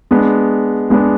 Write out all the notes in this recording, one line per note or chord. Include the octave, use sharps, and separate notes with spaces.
G#3 B3 D4
G#3 B3 D4